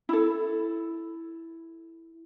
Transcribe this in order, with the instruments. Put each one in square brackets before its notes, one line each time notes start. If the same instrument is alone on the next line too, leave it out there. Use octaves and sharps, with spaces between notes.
[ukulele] E4 A4